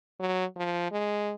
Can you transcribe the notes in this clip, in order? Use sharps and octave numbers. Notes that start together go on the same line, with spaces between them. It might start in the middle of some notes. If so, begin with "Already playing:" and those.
F#3
F3
G#3